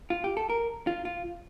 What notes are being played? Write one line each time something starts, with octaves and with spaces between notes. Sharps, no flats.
F4
G4
A4
A#4
F4
F4